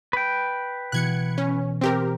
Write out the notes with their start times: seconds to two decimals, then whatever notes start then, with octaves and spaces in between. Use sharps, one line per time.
0.13 B4 G5
0.92 B2 E3 F#6 G#6 C#7
1.38 C#4
1.81 C4 G4 A#4